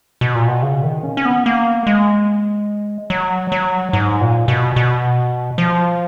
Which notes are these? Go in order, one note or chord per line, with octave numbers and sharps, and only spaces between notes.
B2
A#2
B2
C#3
D#3
C#4
C#4
B3
A#3
G#3
F#3
F#3
G#2
A#2
B2
B2
F3